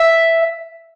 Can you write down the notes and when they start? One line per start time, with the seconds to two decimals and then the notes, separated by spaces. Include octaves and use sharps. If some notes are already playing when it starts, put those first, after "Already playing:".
Already playing: E5